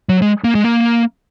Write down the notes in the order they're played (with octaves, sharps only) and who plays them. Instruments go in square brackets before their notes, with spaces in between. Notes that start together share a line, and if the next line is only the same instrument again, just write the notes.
[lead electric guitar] F#3
G#3
A#3
G#3
A#3